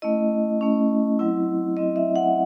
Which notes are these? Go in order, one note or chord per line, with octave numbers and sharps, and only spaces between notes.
A3 C#4 E4 D#5
A3 C#4 E4
F#3 C4 E4
F#3 C4 E4 D#5
E5
F#5